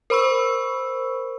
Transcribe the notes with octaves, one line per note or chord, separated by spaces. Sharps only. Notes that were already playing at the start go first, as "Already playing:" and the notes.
A#4 C5 B5 C#6 E6